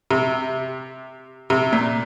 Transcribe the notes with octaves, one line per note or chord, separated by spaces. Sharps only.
C3
C3
A#2